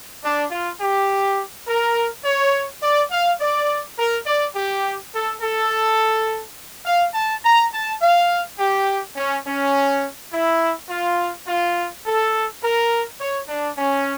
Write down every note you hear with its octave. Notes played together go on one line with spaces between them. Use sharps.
D4
F4
G4
A#4
C#5
D5
F5
D5
A#4
D5
G4
A4
A4
F5
A5
A#5
A5
F5
G4
C#4
C#4
E4
F4
F4
A4
A#4
C#5
D4
C#4